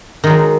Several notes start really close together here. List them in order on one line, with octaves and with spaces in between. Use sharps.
D#3 G#3 F#3